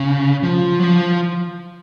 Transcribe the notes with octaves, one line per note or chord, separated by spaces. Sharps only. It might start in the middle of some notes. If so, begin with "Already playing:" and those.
Already playing: C#3
F3
F#3
F3